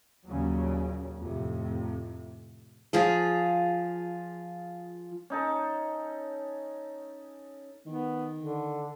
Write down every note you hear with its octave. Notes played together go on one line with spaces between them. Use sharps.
D#2 A#2 C#3 F#3 G3
F2 A2 C3
F3 F4 G#4
C#4 D#4 A4
D#3 B3
D3